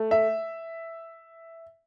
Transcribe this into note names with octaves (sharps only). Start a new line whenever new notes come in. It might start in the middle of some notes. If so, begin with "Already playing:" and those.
Already playing: A3
E5